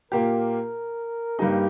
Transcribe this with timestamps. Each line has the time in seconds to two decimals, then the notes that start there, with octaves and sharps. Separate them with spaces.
0.11 A#2 A#3 G4 A#4
1.39 G2 G3 A#3 D#4 G4